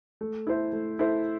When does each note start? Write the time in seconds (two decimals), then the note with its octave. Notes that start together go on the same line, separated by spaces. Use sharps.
0.21 A3
0.47 E4 A4 C5 E5
0.73 A3
0.99 E4 A4 C5 E5